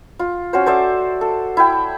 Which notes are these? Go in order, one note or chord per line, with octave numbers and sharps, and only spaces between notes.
F4
C#4 F#4 C5
A4 C5 D5 E5
A4
E4 G5